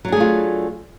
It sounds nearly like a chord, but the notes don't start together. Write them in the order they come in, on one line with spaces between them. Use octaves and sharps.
F#3 D4 G#4 A3 F4